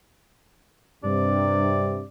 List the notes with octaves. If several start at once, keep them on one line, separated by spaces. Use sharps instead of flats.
G2 C3 D5